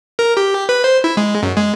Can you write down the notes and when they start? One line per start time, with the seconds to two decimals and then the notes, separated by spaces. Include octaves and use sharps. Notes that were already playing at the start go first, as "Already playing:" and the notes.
0.19 A#4
0.37 G4
0.69 B4
0.84 C5
1.04 E4
1.17 G#3
1.43 F#2
1.56 G#3